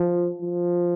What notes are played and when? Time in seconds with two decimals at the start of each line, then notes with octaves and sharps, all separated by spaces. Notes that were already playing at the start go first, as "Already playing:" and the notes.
Already playing: F3
0.41 F3